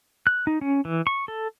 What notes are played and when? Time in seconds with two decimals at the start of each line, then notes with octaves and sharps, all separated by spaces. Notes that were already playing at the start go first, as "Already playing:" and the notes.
0.27 F#6
0.47 D#4
0.61 C#4
0.85 E3
1.07 C#6
1.28 A4